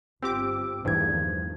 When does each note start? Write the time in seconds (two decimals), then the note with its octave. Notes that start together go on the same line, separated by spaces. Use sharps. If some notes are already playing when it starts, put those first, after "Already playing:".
0.22 G1 C4 F4 G4 D6 E6
0.85 A#1 E2 G2 D#3 F3 A3 C5 G#6